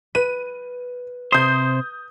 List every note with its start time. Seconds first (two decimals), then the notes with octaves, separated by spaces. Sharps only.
0.15 B4 D#7
1.32 C3 C5 D#6 G6